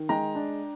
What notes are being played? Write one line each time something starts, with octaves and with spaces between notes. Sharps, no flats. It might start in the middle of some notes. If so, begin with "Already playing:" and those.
Already playing: D#3
G#3 G5 A#5
D4